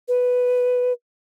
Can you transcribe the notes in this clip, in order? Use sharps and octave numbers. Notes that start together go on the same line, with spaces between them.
B4